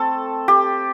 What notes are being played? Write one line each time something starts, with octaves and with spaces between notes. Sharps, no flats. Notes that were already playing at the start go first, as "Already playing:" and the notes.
Already playing: A3 C4 A4
G4